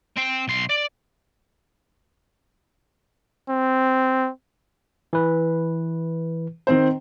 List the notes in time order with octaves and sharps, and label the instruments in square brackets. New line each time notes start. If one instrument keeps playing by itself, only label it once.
[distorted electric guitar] C4 G5
B1 C6
D5
[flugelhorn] C4
[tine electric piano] E3 B4
[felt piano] D#3 C4 C5